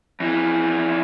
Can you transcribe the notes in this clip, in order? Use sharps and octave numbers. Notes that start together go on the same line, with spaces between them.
F2 E3